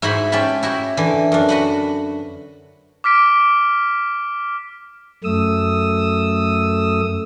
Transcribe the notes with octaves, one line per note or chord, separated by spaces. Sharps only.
G#2 E4 F#4 C5 G#5 B5
C#4 G4 G5 A5 B5
E4 F#4 G4
D3 E3
F#2 D4
F#4 B4 F#5
D6 F6 B6 D7
F#2 A3 D#6 E6